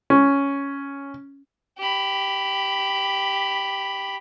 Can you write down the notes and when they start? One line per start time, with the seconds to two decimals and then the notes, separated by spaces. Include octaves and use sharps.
0.10 C#4
1.78 G4 B5